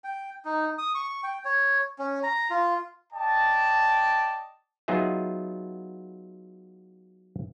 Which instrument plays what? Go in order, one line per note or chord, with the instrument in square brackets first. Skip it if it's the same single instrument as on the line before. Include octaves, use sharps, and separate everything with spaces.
[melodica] G5
D#4
D#6
C#6
G5
C#5
C#4
A#5
F4
[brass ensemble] D5 D#5 G5 A5
[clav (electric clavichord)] F#3 B3 D#4 F4 G#4 E5